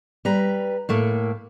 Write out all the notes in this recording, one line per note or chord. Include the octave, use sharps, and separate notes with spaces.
G3 B4 A#5
A2 A3 A#3